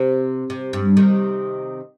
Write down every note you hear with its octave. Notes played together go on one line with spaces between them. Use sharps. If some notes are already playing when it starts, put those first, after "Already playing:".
Already playing: C3
C3
G2
C3 D#3